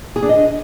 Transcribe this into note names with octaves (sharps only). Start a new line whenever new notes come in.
G#4
D4
D#5